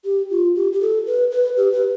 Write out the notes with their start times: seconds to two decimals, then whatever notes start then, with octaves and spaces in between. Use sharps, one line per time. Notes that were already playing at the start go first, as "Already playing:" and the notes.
0.05 G4
0.30 F4
0.56 G4
0.73 G4
0.81 A4
1.06 B4
1.31 B4
1.57 G4
1.72 B4